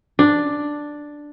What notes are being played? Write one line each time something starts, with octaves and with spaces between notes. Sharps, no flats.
D4